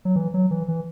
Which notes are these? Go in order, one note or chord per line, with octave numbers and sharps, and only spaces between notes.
F#3
E3
F#3
E3
E3